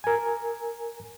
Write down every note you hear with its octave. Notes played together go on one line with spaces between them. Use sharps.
A#4 G#5